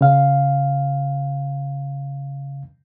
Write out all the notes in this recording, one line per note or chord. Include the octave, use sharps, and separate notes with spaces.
C#3 F5